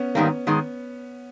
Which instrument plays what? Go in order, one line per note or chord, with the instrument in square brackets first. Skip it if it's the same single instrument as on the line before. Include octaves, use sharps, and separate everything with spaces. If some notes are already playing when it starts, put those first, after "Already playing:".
Already playing: [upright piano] B3 C#4
[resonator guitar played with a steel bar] G#2 D#3 G3 A#3
G#2 D#3 G#3